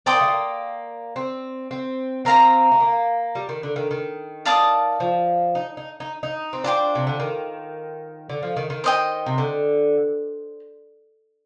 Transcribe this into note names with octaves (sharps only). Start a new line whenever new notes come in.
C4 D5 G5 C6 D#6
A#3
A3
A#3
C4
C4
C4 A#4 F5 A#5
A3
A#3
G3
D#3
D3
D#3
D#3
D5 F5 A5 D#6
F3
D#4
D#4
D#4
D#4
C4
D4 F4 C5 G5 D6
C3
D3
D#3
D3
F3
D#3
D#3
C5 D#5 G5
C3
D3